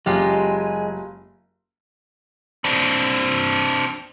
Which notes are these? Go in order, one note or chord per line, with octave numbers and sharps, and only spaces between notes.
F#1 G#3 F4 G4 G#5
C4 D4